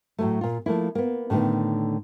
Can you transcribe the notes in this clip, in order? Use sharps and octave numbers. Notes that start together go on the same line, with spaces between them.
A2 F#3 A3
A#2 F4
F3 A3 A#3 E4
A#3 B3
A2 D3 D#3 A3 B3